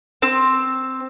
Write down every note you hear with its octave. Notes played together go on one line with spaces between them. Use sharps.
C4